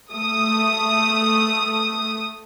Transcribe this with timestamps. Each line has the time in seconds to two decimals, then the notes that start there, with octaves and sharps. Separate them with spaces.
0.15 A3 D#6